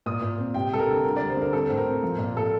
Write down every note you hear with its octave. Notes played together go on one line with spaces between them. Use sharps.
A#2 D#6
A#2
C4
C3 G5
G3 A4
A#4
D2
D2 A#4
G3 D5
C5
D3 A#4
C4 A4
A2 C5
A#4
C4
F3
A#2
A#2 A4